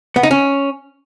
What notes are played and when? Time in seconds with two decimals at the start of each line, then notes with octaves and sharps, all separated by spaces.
0.16 B3
0.23 D#4
0.31 C#4